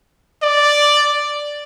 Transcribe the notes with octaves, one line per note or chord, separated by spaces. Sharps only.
D5